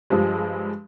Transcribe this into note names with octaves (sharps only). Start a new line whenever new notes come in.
G2 F3 G3 G#3